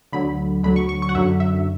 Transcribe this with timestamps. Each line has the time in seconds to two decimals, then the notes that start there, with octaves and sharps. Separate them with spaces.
0.12 D2 D3 F#3 B5
0.64 D2 D3 F#3 B5
0.76 C#6
0.89 C#6
1.02 C#6
1.09 F#5
1.15 F#2 D3 F#3 E5
1.40 E5